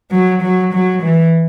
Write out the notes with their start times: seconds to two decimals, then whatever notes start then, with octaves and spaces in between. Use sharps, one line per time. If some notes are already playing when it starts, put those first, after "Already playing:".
0.11 F#3
0.42 F#3
0.73 F#3
1.03 E3